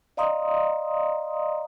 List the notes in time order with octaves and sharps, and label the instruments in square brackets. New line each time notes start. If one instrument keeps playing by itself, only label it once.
[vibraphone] D5 D#5 F5 A#5 C6 D#6